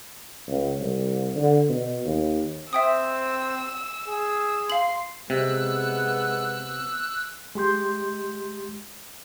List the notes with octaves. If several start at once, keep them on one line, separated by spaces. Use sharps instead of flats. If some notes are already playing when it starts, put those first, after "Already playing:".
C#2
C2
D3
B2
D#2
C4 E5 G5 D#6 E6
G#4
F5 C6 F#7
C3 G#3 B3 E6 F#6
G#3 G4 C6 G6